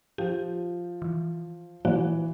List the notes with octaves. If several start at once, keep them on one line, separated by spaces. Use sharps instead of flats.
F3 G4
E3
A#2 E3 F3 A#3 F#4